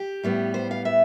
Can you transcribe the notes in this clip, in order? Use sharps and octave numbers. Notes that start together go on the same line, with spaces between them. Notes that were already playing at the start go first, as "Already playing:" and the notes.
Already playing: G4
A2 G3 B3
C5
F5
E5